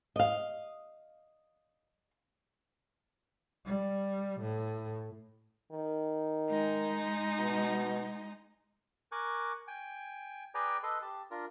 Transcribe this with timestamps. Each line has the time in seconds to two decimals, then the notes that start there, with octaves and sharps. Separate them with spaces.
0.16 D#5 F5
3.65 G3
4.40 A2
5.72 D#3
6.50 G#3 D#4
7.39 B2
9.12 A#4 G#5 C#6 D6 F#6
9.67 G5 G#5
10.55 G#4 B4 D5 G5 G#5 A#5
10.83 A4 B4 D#5 C6
11.02 G4 A5
11.31 D4 F4 A#4